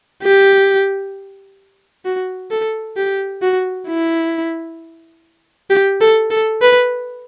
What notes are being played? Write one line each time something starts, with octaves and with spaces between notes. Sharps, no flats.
G4
F#4
A4
G4
F#4
E4
G4
A4
A4
B4